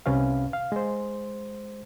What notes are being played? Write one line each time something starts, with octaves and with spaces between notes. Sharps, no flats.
C2 C3 C#4 B4 F5
F5
G#3 C5